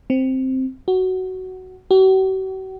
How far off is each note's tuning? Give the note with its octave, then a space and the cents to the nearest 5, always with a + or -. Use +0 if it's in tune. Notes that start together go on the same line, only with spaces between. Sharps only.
C4 +0
F#4 +10
F#4 +45